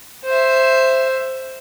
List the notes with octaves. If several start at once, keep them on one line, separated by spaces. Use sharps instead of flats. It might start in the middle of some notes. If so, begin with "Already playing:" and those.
C5 E5